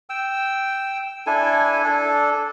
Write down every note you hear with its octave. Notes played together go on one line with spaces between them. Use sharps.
G5 E6
D4 E4 A4 G#5
D4 A4